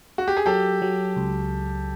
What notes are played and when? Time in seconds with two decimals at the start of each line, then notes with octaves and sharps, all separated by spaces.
0.18 F#4
0.28 G4
0.37 G#4
0.46 F#3 G4 A4
0.82 F#3
1.17 C#2